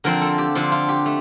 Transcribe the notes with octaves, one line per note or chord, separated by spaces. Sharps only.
D3 F3 C4 A#4
A4
G4
D3 F3 C4 F4
F4
G4
A3